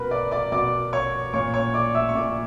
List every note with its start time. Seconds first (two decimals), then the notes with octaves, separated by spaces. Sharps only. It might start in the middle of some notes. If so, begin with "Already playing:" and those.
Already playing: B2 A#4 B4 B5
0.11 D5 D6
0.31 D5 D6
0.52 B2 D5 D6
0.93 C#5 C#6
1.34 A#2 C#5 C#6
1.54 C#5 C#6
1.74 D5 D6
1.94 E5 E6
2.09 C#6
2.15 A#2 D5 D6